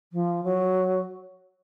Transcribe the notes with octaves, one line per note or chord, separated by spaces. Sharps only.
F3
F#3